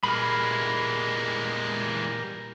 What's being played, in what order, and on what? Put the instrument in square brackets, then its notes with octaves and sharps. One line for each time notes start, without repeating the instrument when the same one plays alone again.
[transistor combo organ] A#2 G3 A#4 [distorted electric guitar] E3 G#3 [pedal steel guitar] B5 F6